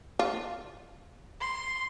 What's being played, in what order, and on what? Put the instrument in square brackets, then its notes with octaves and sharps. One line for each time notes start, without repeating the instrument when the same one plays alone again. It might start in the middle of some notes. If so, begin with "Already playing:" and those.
[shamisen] F4
[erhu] C6